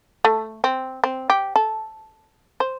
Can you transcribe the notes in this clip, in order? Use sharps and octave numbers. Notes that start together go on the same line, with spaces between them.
A3
C4
C4
G4
A4
C5